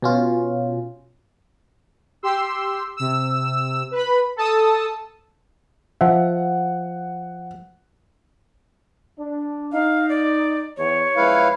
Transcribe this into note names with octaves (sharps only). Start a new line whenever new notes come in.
B2 C#4 F4
G4 C6 E6
C3 E6
B4 B5
A4 A5 D#6 E6
F3 E5 F#5
D4
D#4 F5
D5
E2 C#5
F#2 F3 G#3 E4 B4 F5